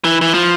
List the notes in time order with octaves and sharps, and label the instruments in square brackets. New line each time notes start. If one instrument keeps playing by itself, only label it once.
[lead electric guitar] E3
E3
F3